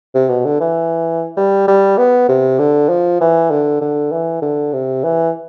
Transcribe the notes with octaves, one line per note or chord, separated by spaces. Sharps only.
C3
B2
D3
E3
G3
G3
B3
C3
D3
F3
E3
D3
D3
E3
D3
C3
E3